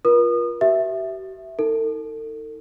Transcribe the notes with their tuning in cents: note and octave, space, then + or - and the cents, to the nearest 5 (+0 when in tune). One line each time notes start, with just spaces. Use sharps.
F4 +0 A#4 +45 D#6 -35
G4 -45 E5 +0
D#4 +40 A4 +40